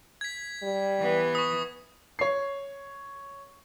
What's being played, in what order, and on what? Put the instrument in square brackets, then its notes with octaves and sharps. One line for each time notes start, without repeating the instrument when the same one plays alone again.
[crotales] G#6 B6
[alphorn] G3
[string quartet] E3 B3
[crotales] C#6 D#6
[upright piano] C#5 C7